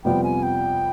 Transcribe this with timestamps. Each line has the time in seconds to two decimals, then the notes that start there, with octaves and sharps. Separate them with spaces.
0.04 F2 C3 G3 B3 F4 G5
0.24 G#5
0.43 G5